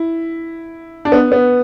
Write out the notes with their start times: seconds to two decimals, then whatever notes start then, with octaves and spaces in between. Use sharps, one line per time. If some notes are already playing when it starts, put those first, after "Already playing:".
Already playing: E4
1.05 D4
1.12 B3
1.32 B3